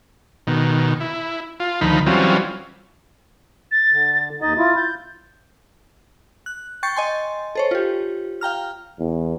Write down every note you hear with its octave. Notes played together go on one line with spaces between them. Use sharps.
B2 D#3
E4
F4
D2 D#3 F3 D#4 B5
E3 F#3 G3 C4 C#4 F4
A6
D3
D#2 D#4 D#5 A6
E4 F4
G6
F#6
G5 C#6 G6 A6 C7 C#7
D#5 G#5 C6
A4 C5 C#5
F4 G4
F5 G5 A#5 F6
E2